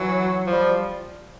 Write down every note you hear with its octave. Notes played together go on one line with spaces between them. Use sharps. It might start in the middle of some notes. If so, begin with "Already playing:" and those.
Already playing: E3 F#3
F3 G3